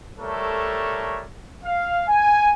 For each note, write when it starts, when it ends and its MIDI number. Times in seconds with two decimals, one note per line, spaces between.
0.19 1.22 55
0.19 1.22 57
0.19 1.22 69
0.19 1.22 70
0.19 1.22 73
1.64 2.02 77
2.07 2.51 80